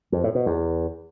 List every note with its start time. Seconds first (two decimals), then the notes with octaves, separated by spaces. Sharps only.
0.12 F2
0.24 A2
0.35 B2
0.46 E2